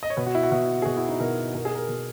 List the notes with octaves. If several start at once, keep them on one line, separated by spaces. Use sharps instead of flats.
D#5
C#5
B2 B4
F#4
E4
F#4
B2 E4
G#4
B2 F#4
E4
D#4
B2 A#4
B2 A#4
G#4
A#4
B2